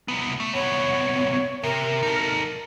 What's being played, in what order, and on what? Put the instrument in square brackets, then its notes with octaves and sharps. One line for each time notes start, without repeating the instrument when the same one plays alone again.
[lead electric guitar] C2 B3
A3
[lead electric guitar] C2 B3 [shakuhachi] C#5
[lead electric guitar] C3 [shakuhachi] A#4
[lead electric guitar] D#4 A4